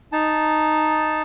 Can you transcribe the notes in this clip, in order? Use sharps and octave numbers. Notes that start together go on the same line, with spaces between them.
D#4 A5